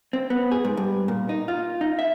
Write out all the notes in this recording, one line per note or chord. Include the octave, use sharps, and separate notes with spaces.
C4
B3
G#4
G#2
G2
A#2
D#4
F4
D#4
E5